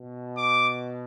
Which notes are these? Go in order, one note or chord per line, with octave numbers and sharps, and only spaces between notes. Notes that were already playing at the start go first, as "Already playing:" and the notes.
Already playing: B2
D6